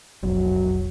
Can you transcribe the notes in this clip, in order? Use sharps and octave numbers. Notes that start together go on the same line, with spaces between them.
E1 B1 F2 F#3